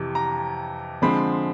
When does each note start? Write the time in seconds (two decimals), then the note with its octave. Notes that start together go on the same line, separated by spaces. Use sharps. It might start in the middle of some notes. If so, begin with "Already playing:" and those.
Already playing: F2 C3 E3
0.15 A#5
1.02 D3 F3 G#3 C4 B5